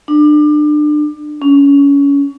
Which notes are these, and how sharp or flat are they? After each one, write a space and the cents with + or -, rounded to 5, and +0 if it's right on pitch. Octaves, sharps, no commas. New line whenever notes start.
D4 +30
C#4 +25